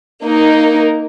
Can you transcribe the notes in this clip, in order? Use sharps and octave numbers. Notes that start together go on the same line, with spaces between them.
A#3 D#4 A#4